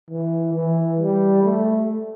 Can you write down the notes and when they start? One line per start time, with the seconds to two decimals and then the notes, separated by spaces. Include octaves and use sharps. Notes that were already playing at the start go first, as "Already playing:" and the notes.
0.10 E3
0.54 E3
1.00 G3
1.44 A3